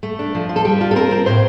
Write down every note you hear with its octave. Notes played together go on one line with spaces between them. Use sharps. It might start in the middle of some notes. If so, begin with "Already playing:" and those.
A3
D4
F3
F4
A4
G3 G4
F4
A4
C4 A#4
C4
A2 C5